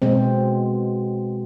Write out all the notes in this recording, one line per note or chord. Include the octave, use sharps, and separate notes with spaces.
B2 G#3 C4